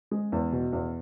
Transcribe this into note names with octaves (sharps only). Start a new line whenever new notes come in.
G#3
E2
B2
E2